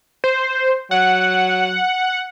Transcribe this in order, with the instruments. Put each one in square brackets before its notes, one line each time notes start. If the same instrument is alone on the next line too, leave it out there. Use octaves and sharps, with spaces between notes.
[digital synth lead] C5
[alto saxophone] F#3 [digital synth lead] F#5